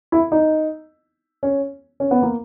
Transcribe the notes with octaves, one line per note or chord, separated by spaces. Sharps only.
E4
D#4
C#4
C#4
B3
A#3